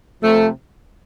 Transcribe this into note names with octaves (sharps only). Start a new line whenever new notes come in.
C3 F3 A3